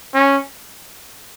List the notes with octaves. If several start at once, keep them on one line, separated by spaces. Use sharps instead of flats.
C#4